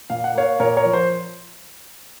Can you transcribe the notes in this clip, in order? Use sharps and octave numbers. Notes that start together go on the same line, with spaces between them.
A#2 F5
F#5
A#3 C#5 F5
A#2 A#4 C#5
A#4 C#5
F3
C5